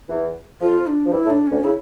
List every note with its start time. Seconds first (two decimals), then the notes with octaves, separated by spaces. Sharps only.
0.09 E2 E3
0.61 F2 F3 F4
0.87 D4
1.06 F3
1.12 G2 G3 E4
1.26 A2 A3
1.30 D4
1.47 D2 D3 C#4
1.64 C#3 E4